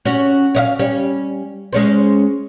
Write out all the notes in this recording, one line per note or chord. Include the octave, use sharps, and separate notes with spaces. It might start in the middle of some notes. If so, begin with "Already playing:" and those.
C#4 F#4
C#4 D#5 F5
G3 C#4
G#3 C#4 C5